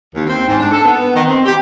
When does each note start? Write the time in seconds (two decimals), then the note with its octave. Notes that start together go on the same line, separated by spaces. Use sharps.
0.13 D#2
0.26 C4
0.47 G#2
0.59 D4
0.71 A4
0.85 B3
1.14 D#3
1.26 C4
1.45 G4